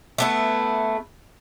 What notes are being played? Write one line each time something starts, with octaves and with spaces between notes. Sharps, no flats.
A3 B3 E4